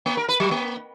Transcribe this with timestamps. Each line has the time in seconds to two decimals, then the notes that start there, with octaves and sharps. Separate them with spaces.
0.06 A#3
0.17 A#4
0.29 B4
0.40 F#3
0.51 A#3